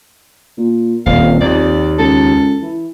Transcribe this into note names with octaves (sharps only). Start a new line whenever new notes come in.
A#2
D#1 F2 F5
D#2 D5
C#2 A4
E3